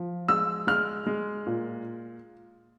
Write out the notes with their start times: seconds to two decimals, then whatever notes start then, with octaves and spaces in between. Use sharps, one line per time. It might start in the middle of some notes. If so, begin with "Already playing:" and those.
Already playing: F3
0.28 G#3 E6
0.67 G#3 F6
1.07 G#3
1.47 A#2